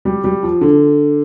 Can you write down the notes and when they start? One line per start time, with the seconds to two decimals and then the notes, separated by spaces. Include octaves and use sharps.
0.05 G3
0.24 G3
0.43 F3
0.61 D3